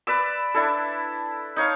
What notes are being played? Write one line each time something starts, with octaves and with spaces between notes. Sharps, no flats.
B4 D5 E6
D4 E4 A4
D#4 C#5 F5